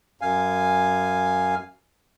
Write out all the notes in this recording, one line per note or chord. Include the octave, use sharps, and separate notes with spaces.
F#2 F5 G#5